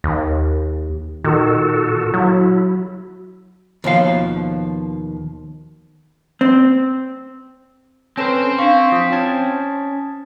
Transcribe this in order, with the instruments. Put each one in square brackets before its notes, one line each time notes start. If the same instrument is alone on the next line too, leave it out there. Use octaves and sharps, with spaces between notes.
[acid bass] D#2
[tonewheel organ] A#2 F#4 A4 [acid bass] D#3
[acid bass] F#3 [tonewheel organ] E4
[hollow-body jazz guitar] D#2 B2 F3 F5
C4
[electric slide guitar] C4 C5 [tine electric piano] C#4 A4 B4 [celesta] A5 A#6 E7
[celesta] D4 F5 [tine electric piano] C#6 B6
[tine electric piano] F3 [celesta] D#6 B6
[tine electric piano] C#4 A5 G#6